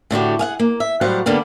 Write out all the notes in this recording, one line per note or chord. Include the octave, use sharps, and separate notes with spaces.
A2 D3 F#4 G4
G#4 F5 F#5
A#3
E5
A2 F#3 G3 C5 F5 F#5
D3 G3 A#3 B3